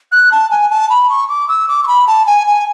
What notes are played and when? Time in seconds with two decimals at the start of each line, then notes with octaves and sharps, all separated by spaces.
0.12 F#6
0.32 A5
0.51 G#5
0.70 A5
0.90 B5
1.10 C#6
1.29 D6
1.48 E6
1.68 D6
1.83 C#6
1.87 B5
2.07 A5
2.27 G#5
2.47 G#5